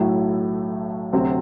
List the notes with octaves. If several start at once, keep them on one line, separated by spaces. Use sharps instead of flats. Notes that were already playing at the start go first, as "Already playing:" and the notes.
Already playing: B1 A2 F#3 A3 E4
D2 C3 F#3 C4